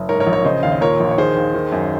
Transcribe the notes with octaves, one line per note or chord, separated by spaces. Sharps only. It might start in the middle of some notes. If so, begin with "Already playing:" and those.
Already playing: F#1
G#2 A#4 C#5
A#4 C#5
A#1
A#4 C#5
C#3 C5 D#5
D#2 F5
D#5
A#2 A#4 C#5
A#1
C#5
D#3 G#4 C5
D#2
D#3
F#2